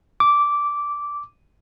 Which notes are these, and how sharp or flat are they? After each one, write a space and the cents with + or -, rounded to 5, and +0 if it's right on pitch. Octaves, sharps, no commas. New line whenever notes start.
D6 -10